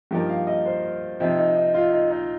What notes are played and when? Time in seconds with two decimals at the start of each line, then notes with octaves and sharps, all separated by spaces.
0.11 G2 F3 A#3 D#4 G4 A#4
0.29 F5
0.47 D#5
0.66 C5
1.20 C3 F3 C4 D#4
1.38 D#4
1.56 D#4
1.74 F4
1.92 D#4
2.11 D#4